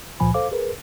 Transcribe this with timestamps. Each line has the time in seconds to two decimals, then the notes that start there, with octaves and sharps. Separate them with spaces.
0.20 C#2 A#2 F3 G#5 B5
0.34 A4 C5 F5 D6
0.52 G#4 A#4 B4